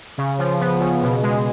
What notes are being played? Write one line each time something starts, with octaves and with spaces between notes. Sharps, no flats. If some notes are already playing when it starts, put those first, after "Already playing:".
C#3
F3
B3
C#3
B2
G#3